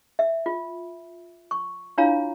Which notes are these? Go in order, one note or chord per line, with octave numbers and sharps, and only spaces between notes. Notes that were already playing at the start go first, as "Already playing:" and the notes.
E5
F4
C#6
D4 E4 F4 C#5 F5 A#5